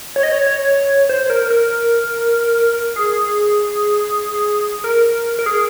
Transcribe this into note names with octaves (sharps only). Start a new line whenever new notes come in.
C#5
D#5
C#5
C#5
C5
A#4
A#4
G#4
A#4
A#4
G#4